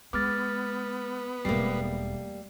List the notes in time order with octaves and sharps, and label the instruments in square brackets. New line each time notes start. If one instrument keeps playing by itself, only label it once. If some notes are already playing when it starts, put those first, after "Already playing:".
[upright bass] G#3 [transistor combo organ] B3 [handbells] D6 F6 A6
[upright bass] E1 E2 [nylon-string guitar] G3 A#3 [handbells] A3 C7